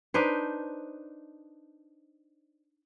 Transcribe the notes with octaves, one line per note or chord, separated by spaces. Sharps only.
D4 D#4 B4 C5